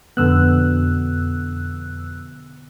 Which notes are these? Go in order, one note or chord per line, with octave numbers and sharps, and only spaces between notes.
F2 B2 D3 B3 E6 F#6